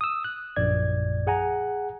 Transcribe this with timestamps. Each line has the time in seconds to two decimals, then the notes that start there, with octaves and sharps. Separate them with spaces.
0.01 D#6 E6
0.24 F#6
0.56 A#1 F#2 D5 G#6
1.27 G#4 F#5 G#5 A#5